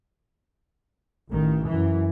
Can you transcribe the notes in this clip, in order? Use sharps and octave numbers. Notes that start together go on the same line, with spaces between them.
A1 D#3
F#2 E3